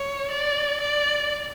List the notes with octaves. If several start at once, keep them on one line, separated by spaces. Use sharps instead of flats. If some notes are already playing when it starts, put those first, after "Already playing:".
Already playing: C#5
D5
D5